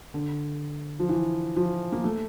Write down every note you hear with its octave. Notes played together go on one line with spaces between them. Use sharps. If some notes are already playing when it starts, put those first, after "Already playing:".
D3
F3
E3
F3
A#3
A3